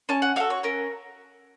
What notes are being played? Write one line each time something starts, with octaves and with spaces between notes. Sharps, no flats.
C#4 A5
F#5
F#4 A4 F5
C#5
C#4 A#4